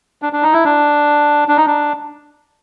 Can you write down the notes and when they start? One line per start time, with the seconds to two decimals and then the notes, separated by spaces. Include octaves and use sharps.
0.22 D4
0.33 D4
0.43 D#4
0.53 E4
0.64 D4
1.48 D4
1.57 D#4
1.67 D4